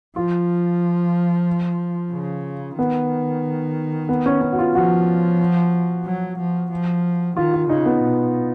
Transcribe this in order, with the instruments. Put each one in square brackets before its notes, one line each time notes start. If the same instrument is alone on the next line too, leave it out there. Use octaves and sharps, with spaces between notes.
[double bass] F3 [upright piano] F4
[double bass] C#3
[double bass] D#3 [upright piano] B3
[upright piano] B3
C#4
C#4
F#4
F4
[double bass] F3 [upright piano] F#4
[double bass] F#3
F3
F3
[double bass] D#3 [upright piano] F4
[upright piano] F4
[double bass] C#3 [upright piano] D#4
[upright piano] B3
[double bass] B2